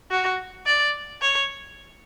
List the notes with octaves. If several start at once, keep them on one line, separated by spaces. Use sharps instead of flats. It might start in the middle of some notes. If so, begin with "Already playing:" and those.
F#4
D5
C#5